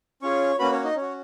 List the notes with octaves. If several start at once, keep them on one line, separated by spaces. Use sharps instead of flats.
C#4 F4 G#4 C#5 C#6
A#3 C#4 F#4 B4 B5
C#4 C#5
D#4 D#5
C#4 F#4 C#5